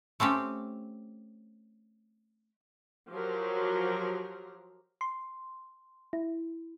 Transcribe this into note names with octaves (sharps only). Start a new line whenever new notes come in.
A3 C4 C#4 G4
F3 F#3 G4 A#4
C6
E4